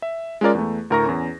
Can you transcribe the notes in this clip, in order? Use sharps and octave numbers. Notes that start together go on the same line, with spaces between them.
E5
G#3 C#4 F4 A#4 D5
E2 A3
D2 A2 A#4 A#5 C#6 A#6
E2 C#4